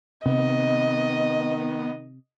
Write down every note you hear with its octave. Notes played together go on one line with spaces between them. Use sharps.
C3 D#3 B3 D#5